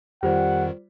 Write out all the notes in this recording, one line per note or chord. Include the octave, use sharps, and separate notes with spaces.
F2 D#3 G3 F4 C5 D5 F#5